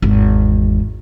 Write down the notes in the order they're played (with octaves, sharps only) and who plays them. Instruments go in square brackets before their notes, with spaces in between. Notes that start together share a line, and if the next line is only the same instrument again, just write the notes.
[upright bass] G#1 E2